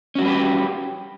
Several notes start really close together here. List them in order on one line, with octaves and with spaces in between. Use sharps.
C#4 F#4 G3 B4 G4